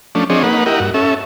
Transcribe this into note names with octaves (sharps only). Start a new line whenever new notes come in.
F3 A3 C#4 D4
F3 C4 D4 G#4 C#5 D#5
A#3 D#4 B4 F#5
E4 G4 A#4 D#5 F#5
G2 F#4
C#4 A4 E5